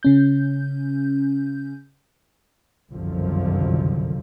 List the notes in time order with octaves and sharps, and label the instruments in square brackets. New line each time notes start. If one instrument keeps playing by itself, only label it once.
[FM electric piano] C#3 C#4 G6
[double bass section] G1 C2 F#2 D3 D#3 F3